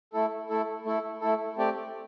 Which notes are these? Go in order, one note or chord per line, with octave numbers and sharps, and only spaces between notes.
A3 E4 A4
A3 E4 A4
A3 E4 A4
A3 E4 A4
A3 C4 G4 D5